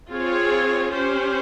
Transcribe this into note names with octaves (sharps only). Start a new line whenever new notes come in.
C4 F4 G#4 C#5
C#4 G4 C5